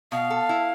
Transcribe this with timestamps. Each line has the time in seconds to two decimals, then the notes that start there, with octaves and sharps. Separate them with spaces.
0.12 B2 F5
0.30 A4
0.49 E4